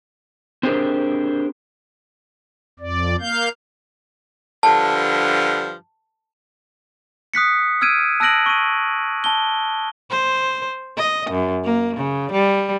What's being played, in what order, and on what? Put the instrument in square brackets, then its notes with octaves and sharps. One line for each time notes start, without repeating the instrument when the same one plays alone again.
[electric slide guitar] C4 D4 G4 G#4 A#4 C5
[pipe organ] F2 D5
A#3 F5 G6
[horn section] G2 D3 F3 [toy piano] A5
[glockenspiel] D#6 F#6 B6 C#7
E6 F6 G#6 D7 D#7
A5 E6 F#6 A#6 D7 F#7
C#6 D#7
A5 G7
[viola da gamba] C5
D#5
F#2
A#3
C#3
G3